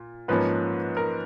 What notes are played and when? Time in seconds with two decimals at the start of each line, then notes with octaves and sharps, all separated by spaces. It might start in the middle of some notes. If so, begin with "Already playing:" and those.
Already playing: A#2
0.28 G#2 F3 A#3 C#4 B4
0.97 A#4